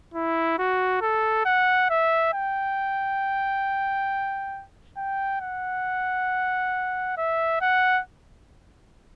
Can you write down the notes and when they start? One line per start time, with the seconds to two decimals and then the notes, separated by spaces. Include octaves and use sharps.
0.14 E4
0.58 F#4
1.01 A4
1.45 F#5
1.90 E5
2.34 G5
4.97 G5
5.41 F#5
7.17 E5
7.61 F#5